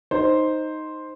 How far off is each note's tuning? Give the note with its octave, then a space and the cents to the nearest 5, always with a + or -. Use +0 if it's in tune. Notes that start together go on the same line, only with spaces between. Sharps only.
D#4 +0 C5 +0